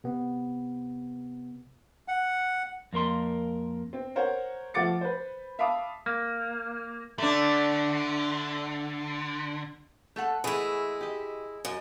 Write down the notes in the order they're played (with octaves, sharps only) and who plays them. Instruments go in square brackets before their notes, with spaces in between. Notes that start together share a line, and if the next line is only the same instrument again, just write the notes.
[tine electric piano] C3 B3
[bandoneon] F#5
[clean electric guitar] F2 A#3 A#4 C6
[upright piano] C4
A#4 C5 C#5 F#5
F3 A3 F#5 D6 A6 C#7
B4 C5
E5 F5 A5 B5 D6 D#6
[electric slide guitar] A#3
[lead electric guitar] D3 [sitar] A3 D4
[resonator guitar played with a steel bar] A3 A4 F#5
[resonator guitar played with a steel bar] E3 A3 B4 [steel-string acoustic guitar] G#3 E4
[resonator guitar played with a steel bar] G4 D#5
[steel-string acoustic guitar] F#2 [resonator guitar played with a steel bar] D#5